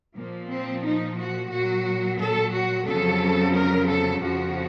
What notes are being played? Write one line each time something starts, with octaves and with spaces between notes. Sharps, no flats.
A#2 F3 A#3
C4
D#4
F#4
A#2 F#3 F#4
A4
F#4
F2 C#3 F#3 A4
A#4
A4
F2 C#3 F3 F#4